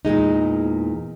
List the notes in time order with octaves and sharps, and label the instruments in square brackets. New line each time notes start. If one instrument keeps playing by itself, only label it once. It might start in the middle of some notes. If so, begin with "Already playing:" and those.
[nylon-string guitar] E2 A#2 G#3 D#4